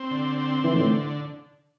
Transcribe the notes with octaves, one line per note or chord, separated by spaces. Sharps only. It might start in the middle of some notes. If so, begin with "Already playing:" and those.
Already playing: C4
D3
C4
D3 E3
A2